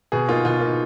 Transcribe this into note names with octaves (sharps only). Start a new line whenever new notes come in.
B2 G#4
A#3 D#4 F4
B2 F4
A#3 D#4